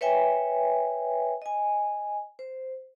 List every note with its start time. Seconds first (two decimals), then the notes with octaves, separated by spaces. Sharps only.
0.01 B4 C#5 E5 G5 G#5
1.42 D#5 G#5
2.39 C5